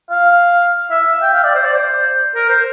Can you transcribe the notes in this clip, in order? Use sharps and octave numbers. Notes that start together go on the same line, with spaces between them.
F5
E5
G5
F5
D5
C5
D5
C5
A#4
C5